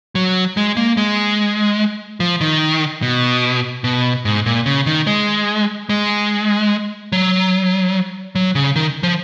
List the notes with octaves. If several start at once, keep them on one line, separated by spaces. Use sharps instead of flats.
F#3
G#3
A#3
G#3
F3
D#3
B2
B2
G#2
A#2
C#3
D#3
G#3
G#3
F#3
F#3
C#3
D#3
F3